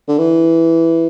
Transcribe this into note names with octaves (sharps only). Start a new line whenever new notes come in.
D3
E3